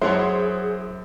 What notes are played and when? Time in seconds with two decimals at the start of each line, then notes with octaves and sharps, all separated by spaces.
0.02 F#2 E4 G#4 C5 C#5 F#5